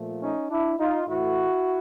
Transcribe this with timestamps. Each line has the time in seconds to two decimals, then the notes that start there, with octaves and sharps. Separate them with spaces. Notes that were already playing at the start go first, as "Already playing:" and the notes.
Already playing: A#2 F3 A3
0.21 C#4 D#4
0.50 D4 E4
0.79 D#4 F4
1.07 A2 E3 A3 E4 F#4